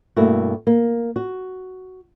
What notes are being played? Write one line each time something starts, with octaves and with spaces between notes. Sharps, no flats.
G2 B2 A3 A#3 E4 F#4
A#3
F#4